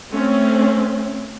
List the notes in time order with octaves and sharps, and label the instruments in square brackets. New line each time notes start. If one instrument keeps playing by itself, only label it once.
[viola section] A3 C4 C#4